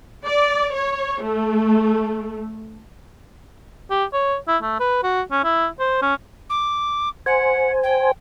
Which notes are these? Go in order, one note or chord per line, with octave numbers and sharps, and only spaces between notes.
D5
C#5
A3
G4
C#5
E4
A3
B4
F#4
C#4
E4
C5
C#4
D6
C5 F#5 G#5
G5